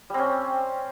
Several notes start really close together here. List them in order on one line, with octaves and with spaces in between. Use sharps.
G3 C4 C#4